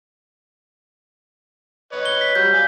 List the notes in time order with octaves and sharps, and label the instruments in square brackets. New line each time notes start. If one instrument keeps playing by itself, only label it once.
[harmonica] B4 C#5 D#5
[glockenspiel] G7
B6
[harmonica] F#3 G3 [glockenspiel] G6
[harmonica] D5 F5 G#5